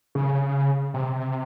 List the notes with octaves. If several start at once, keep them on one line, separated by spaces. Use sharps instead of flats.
C#3
C3